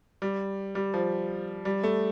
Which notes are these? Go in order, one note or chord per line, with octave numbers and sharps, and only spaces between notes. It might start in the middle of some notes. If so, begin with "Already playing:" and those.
G3
G3
F3
G3
A3